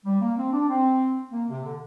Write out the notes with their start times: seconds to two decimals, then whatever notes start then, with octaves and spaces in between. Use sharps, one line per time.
0.05 G3
0.21 A#3
0.37 C4
0.52 D4
0.69 C4
1.32 A#3
1.49 C3
1.64 D3